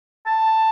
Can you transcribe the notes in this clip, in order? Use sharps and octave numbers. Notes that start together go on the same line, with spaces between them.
A5